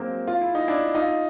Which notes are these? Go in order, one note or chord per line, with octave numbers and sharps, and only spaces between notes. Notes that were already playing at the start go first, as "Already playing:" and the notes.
Already playing: F#3 G#3 A#3 C4
F4
E4
D#4
D4 E4
D#4 F4